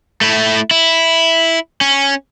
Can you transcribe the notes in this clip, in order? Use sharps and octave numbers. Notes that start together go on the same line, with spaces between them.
A3 E4
E4
C#4